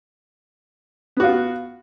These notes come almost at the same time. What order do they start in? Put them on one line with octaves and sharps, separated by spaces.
B3 F#4 F4